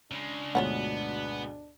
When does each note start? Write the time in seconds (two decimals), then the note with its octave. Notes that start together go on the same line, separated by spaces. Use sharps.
0.11 C#3 G#3 D4
0.55 D2 G#2 B2 B3 F4 C#5 F#5